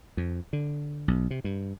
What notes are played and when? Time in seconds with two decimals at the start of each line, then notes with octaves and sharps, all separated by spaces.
0.17 F2
0.53 D3
1.08 B1
1.31 C3
1.44 G2